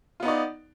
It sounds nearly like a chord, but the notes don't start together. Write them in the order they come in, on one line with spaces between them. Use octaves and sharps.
F4 B3 D#4 D5